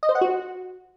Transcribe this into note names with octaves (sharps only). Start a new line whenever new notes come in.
D#5
C5
F#5
F#4